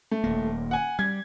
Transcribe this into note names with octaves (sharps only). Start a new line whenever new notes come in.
A3
D#1 A#3
F#5 G#5
G3 G#6